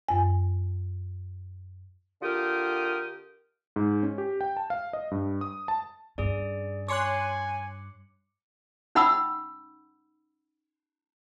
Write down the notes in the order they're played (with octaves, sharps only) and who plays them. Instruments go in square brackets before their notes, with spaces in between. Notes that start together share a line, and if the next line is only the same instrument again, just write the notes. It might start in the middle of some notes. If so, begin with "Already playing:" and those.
[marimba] F#2 G#5
[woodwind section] D3 F4 G4 A#4 G5 D#6
[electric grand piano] G#2
C#4
G4
G5
A5
F5
D#5
G2
D#6
A5
[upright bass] G2 C#4 [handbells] G#4 D5
[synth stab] C#5 C6 F#6 [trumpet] G#5 [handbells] D6 C#7
[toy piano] C#4 D#4 F#5 B5 D#6 E6